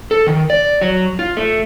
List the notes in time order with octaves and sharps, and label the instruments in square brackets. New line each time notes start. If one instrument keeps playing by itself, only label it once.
[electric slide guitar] A4
D#3
D5
F#3
F4
A3